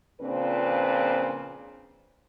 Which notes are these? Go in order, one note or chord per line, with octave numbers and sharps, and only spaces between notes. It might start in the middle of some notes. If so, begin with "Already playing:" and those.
A#2 C#3 F3 C4 D4 B4